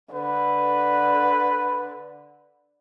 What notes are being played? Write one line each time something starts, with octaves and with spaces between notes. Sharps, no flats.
D3 B4